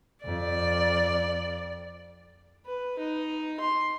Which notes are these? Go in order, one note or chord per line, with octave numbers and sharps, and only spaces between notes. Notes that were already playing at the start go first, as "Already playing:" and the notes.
F2 D5
B4
D#4
C6